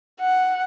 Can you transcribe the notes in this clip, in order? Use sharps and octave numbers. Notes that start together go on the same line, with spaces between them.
F#5